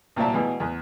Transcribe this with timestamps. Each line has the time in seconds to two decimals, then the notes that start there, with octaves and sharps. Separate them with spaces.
0.16 C2 A#2 F#3 E5 A5
0.34 B2 E3 G#3
0.60 E2